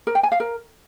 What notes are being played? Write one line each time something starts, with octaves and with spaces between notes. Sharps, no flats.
A#4
G5
G#5
F5
A#4